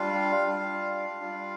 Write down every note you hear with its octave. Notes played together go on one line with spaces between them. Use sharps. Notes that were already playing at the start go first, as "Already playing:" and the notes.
Already playing: G3 D4 F4 F5
G3 D4 F4
G3 D4 F4